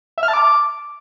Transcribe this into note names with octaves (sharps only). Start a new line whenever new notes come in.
E5
F6
A5
D6